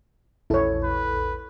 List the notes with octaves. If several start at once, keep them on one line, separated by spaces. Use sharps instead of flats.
A#1 E2 E4 A4 C#5
B4